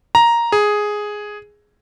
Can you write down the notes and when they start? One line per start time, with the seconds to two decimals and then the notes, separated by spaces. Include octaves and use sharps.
0.15 A#5
0.52 G#4